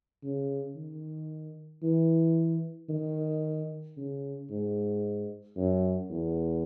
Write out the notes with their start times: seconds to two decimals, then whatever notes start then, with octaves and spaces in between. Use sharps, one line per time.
0.23 C#3
0.76 D#3
1.83 E3
2.89 D#3
3.97 C#3
4.50 G#2
5.57 F#2
6.10 E2